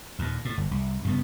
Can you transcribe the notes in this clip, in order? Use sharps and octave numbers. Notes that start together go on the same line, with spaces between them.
D#2 A#2
A2
G1
C2
G2 C#3 B3